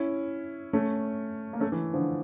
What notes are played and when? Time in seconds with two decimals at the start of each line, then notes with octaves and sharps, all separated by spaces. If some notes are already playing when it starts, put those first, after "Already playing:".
Already playing: C#4 E4
0.73 A3 C#4
1.53 A#3
1.60 A3 C#4
1.72 E3
1.94 D3 F3